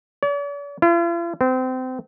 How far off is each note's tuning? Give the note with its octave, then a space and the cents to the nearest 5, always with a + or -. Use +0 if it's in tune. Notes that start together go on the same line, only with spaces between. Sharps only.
D5 -45
F4 -45
C4 -30